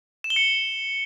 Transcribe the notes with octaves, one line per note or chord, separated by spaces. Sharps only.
E7
G7
C#7